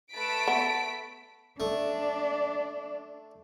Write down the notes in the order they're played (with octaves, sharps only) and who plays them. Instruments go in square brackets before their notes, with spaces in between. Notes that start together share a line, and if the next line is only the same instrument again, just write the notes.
[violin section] A3 B6 D7 [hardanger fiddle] B4 A5
[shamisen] B3
[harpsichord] A3 [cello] D4